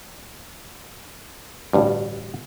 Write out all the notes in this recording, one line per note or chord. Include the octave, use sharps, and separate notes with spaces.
A1 D2 G2